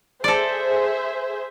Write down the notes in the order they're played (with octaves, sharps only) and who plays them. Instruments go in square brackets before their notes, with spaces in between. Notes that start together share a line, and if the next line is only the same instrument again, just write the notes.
[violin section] G#4 C5 E5 [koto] A4 D5